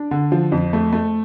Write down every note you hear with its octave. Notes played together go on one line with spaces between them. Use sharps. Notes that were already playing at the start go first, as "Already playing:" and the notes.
Already playing: D4
D3
F3
F2
A3
A3